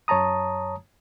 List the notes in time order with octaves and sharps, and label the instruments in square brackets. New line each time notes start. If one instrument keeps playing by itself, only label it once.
[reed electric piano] F#2 C#5 A5 A#5 D#6